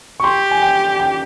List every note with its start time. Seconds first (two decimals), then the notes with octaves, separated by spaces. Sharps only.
0.20 C#6
0.24 G4 C6
0.51 G#5
0.62 G5
1.00 G5